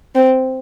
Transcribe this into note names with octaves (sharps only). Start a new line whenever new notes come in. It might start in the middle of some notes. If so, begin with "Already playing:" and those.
C4